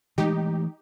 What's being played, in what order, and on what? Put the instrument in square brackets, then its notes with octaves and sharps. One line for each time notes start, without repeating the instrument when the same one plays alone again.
[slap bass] E3 G#3 A3 [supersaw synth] D#4 G4